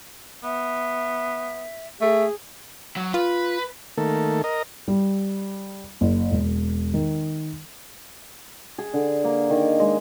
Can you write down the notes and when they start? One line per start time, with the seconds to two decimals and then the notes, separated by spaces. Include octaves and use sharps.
0.44 B3 E5
2.01 A3 G#4
2.96 F#3
3.14 F4 B4
3.97 D#3 A3 A#3 A4
4.44 A#4 D#5
4.88 G3
6.01 F#1
6.31 E1
6.94 D#3
8.78 G#4
8.93 D3
9.24 A#3
9.50 D#3
9.80 G#3